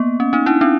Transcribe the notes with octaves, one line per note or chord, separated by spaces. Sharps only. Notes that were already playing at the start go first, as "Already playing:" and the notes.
Already playing: A#3 B3
C#4
C#4 D#4
D4 E4
C4 D4